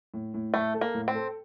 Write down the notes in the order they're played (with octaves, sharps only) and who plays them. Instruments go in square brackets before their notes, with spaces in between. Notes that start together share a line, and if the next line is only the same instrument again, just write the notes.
[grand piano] A2
A2
[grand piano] A2 [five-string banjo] A3
[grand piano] A4
[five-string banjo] A#3
[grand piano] A2
[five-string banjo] C4
[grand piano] A4